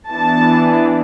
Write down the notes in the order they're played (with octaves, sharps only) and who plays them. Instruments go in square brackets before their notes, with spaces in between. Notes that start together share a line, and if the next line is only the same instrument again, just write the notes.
[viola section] E3 B3 D4 A5